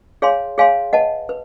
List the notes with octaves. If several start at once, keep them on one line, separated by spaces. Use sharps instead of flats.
G#4 C#5 F5 G#5 C6
G#4 C#5 F5 G#5 C6
B4 D#5 F#5 A5
B4